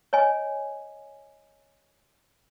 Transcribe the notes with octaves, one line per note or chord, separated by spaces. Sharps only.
C#5 D#5 G#5